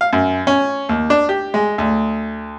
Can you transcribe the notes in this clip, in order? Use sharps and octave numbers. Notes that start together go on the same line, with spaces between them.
F5
F#2
C#4
D#2
D4
G4
G#3
D2